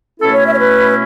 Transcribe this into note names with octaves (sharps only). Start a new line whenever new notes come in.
B2 A3 C#4 E4 A4
C#5
E5
C#5
B4